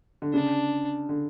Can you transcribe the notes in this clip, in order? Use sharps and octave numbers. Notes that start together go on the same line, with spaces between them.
D3
C#3 D4
D3